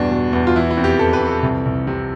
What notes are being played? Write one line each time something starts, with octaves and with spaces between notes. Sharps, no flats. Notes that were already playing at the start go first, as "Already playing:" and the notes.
Already playing: E2 G2 B2 D4
B2
E2
F4
E3 E4
E4
F2
G4
E3 A4
B4
F2
A4
C2
C2
C3